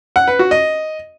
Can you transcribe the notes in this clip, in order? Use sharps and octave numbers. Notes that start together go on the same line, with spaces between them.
F#5
B4
F#4
D#5